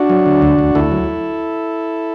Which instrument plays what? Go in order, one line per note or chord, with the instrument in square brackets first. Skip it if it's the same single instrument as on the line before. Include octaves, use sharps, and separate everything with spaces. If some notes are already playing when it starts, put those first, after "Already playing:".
Already playing: [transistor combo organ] D4 F#4
F#3
D3
D2
D2
D2 E4 A4
F#3